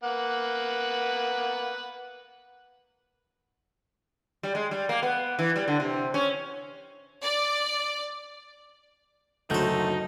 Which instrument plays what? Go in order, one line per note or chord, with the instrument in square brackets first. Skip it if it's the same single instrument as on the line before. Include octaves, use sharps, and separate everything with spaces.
[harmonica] A#3 B4 F#5
[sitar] G3
G#3
G3
A#3
B3
E3
G3
D3
C3
C#4
[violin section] D5
[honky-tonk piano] F#1 D2 G6 [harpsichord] F#3 C5 [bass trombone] A3 [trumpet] D#4